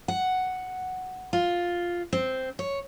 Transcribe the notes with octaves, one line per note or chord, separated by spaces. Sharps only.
F#5
F4
C4
C#5